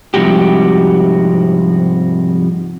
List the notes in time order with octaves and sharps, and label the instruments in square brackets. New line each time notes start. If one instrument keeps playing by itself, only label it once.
[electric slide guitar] G#2 C3 F3 G3 F#4 G4